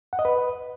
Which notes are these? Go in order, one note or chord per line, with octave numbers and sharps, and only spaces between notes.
F#5
D#5
B4